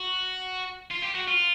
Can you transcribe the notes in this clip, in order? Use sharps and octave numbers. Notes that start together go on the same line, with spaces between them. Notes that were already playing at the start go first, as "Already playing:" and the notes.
Already playing: F#4
F4
G4
F#4
F4